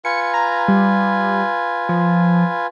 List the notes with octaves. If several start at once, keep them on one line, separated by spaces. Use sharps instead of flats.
F4 B4 G#5 C#7
A#5
G3
F3